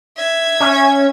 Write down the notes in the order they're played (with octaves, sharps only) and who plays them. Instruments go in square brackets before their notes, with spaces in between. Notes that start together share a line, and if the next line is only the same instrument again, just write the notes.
[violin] E5 G#6
[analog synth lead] C#4